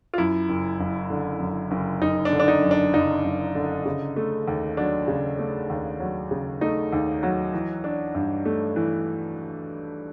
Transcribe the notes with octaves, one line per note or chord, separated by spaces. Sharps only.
F4
F#2 E4
F#1
F#1
D3
F#2
F#1
F#1 D#4
D4
D3
D4
D#4
F#2
D4
F#1 D#4
F#1
D3
C#3
A3
D#2
F#3 D4
C#3
A3
D#2
F#3
C#3
A3 D#4
D#2
F#3
E3
D4
G2
A3
E3